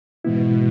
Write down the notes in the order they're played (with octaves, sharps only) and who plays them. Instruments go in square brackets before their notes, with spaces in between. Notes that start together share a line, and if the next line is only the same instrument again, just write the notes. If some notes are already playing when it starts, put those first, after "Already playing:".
[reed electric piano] G#2 E3 G#3 B3 E4 [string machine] B2